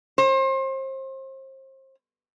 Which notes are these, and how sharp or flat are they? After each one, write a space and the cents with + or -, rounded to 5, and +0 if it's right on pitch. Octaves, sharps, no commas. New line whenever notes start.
C5 +35